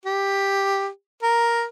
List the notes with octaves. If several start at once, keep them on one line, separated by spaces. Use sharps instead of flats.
G4
A#4